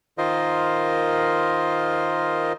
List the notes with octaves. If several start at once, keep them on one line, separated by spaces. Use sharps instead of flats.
D#3 F4 A#4 C5 D#5